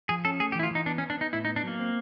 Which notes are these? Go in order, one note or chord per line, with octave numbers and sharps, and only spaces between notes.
F3 G#4
C#4 A4
A3 G#4
G4
E3 E4
F4
E3 D#4
B3 D4
C#4
B3
D4
B3 D#4
A2 E4
D#4
B3
D4
F#3 A#3
C4